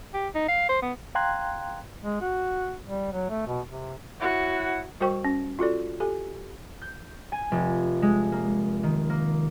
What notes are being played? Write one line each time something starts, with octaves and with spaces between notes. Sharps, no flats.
G4
D#4
F5
C5
B3
F5 G5 A#5 C6 F#6 G#6
G#3
F#4
G3
F#3
A3
B2
C3
E4 F#4 C#5 F#5
G3 F#4 A#4 C5 G5 C#6
C#4
F4 F#4 A4 D5
G4 A4 G#5
G6
G#5
F1
G#3
A#3
D#3
A#3